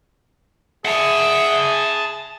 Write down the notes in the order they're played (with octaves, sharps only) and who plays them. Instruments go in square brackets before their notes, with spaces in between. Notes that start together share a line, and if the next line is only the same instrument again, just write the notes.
[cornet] G#4 [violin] E5 [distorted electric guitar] F#5 A5